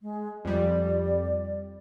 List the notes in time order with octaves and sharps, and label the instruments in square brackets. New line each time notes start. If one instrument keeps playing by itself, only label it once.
[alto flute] G#3
[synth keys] F2 G3 [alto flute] D5